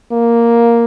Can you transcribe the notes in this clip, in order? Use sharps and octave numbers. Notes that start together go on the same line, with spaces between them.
A#3